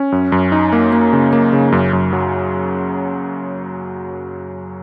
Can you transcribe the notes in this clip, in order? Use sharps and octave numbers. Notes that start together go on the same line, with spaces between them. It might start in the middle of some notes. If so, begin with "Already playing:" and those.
Already playing: C#4
F#2
F#2
D#4
A#3
A#3
C#3
A#3
C#3
F#2
F#2
F#3